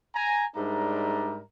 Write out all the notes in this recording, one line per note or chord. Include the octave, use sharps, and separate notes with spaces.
G#5 A#5
G#2 G3 D4 A#4 E5 A#5